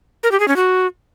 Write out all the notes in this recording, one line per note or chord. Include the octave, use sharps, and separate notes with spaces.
A#4
G4
G#4
C#4
F#4